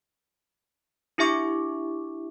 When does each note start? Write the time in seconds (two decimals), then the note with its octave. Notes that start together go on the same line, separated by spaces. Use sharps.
1.18 D4 E4 G4 E5 C#6 D6